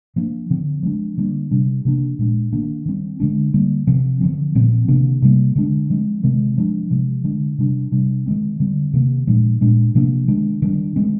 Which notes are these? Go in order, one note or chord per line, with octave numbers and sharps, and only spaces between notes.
F3 A#3 D4
D3 F3 C4
F3 G#3 D4
D3 G3 A#3 D4
C3 G3 D4
C3 F3 A#3 D4
A#2 G#3 D4
D#3 A#3 D4
D#3 G3 C4
D3 G#3 D4
D3 G3 A#3
C3 F3 C4
D3 F3 C4
A#2 F3 C4
C3 D#3 A#3 D4
C3 G3 A#3
D3 G#3 D4
F3 G#3 C4
C3 D#3 G#3 C4
F3 G#3 D4
C3 F3 G#3
D3 G#3 D4
C3 G3 D4
C3 G3 D4
D#3 G#3 C4
D3 G3 C4
C3 D#3 A#3
A#2 F3 G#3 D4
A#2 G#3 D4
C3 F3 A#3 D4
D#3 G#3 D4
D#3 G3 D4
D#3 G#3 C4